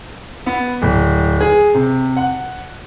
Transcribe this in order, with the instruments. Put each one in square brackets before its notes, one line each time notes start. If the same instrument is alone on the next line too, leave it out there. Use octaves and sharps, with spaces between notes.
[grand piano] B3
D1
G#4
C3
F#5